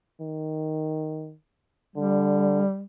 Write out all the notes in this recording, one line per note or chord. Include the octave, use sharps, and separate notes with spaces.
D#3
D3 G3